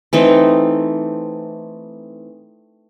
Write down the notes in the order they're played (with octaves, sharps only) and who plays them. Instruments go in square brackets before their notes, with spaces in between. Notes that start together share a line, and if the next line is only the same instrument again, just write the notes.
[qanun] E3 A3 C4 D#4